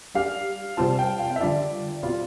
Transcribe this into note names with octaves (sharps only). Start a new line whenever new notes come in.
G3 D4 G4 F5
C3 G3 C4 F4 A5
G5
F5
E5
D3 G3 D4 F4 D5
B2 G3 C4 F4